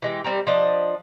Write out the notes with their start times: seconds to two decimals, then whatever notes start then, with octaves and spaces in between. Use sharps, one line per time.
0.02 E3 G#3 G4
0.24 G3 C4 A#4
0.47 F3 D4 D#5